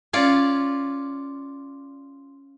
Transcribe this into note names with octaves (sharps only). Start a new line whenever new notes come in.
C#4 F4 D5